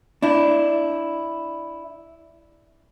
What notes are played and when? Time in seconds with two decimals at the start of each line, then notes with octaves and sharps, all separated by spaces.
0.22 D4 E4